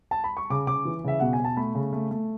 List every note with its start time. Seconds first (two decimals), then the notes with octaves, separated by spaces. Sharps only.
0.11 A5
0.24 B5
0.37 C#6
0.50 C#3 D6
0.67 C#3 D6
0.85 E3
1.04 C#3 E5
1.20 B2 F#5
1.33 G#5
1.39 B2
1.44 A5
1.57 A3 B5
1.75 C#3
1.93 A3
2.11 A3